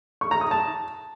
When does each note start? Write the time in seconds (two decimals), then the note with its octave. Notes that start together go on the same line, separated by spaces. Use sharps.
0.21 C#6
0.31 A#5
0.41 D#6
0.51 A5